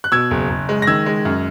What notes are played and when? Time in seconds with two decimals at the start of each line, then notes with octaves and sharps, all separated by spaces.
0.04 F#6
0.12 B2 E6 G#6
0.31 F#1
0.50 F#1
0.69 G#3
0.82 A#6
0.87 D#3 E6 G#6
1.06 G#3
1.25 F#2